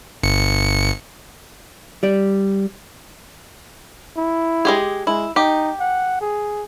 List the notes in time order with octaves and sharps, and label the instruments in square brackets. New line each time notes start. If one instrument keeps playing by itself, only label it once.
[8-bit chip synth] G1 C#7
[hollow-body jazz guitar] G3 D5
[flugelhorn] E4
[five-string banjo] G#3 G4 G#4
[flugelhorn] G#3 [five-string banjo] E4
[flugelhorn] D#4 [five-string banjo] G4
[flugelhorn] F#5
G#4